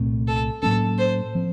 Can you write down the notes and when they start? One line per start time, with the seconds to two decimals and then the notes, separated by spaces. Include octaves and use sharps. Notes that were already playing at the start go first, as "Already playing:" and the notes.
Already playing: C2 A#2 A3 C4
0.28 A4
0.62 A2 F#3 A#3 C#4 A4
0.99 C5
1.35 F3 C4